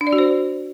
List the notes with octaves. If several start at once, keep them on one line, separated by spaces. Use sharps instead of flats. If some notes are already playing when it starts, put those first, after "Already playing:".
D4
D5
F#4
C5